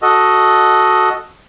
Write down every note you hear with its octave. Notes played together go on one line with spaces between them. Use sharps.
F#4 A4 D#5